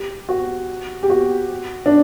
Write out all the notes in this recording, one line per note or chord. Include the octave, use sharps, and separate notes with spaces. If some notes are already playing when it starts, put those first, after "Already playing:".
Already playing: G4
F#4
G4
F#4
D4